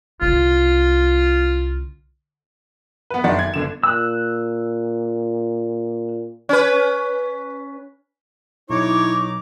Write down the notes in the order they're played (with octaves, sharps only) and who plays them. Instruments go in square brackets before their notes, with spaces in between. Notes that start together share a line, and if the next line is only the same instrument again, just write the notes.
[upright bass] C2 C#3 [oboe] F4
[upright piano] B3 B4
F#1 D#3 D4 F#5 A6
G#6
G1 D3 E7
[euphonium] A#2 [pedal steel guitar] E6 F#6
[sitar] C#4 B4
[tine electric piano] B1 [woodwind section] D#4 A#5 D6 [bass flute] E4 [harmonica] C#5